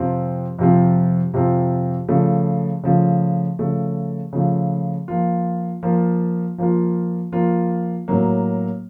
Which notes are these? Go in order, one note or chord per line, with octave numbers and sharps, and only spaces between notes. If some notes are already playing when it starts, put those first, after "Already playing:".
Already playing: F2 C3 F3 C4 F4
F2 C3 F3 C4 F4
F2 C3 F3 C4 F4
C#3 F3 A3
C#3 F3 A3
C#3 F3 A3
C#3 F3 A3
F3 A#3 F4
F3 A#3 F4
F3 A#3 F4
F3 A#3 F4
A2 F#3 A#3